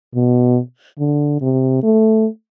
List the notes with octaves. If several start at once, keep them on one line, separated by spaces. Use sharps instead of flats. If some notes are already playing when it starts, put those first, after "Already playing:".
B2
D3
C3
A3